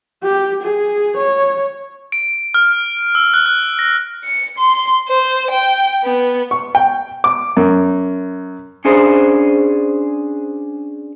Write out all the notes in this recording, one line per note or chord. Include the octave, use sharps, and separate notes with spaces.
G4
G#4
C#5
D7
F6
E6
F#6
F#6
A#6
C#7
C6
C5
G5
B3
C#6
G5
D6
F#2
C#4 D4 G#4 C5